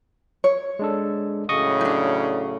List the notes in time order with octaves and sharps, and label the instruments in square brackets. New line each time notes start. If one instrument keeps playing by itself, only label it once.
[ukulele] C#5
[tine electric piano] G#3 D4 A4
[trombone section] A2 C#3 F#3 [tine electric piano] D#5 C#6 D#6
[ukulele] D4 D#4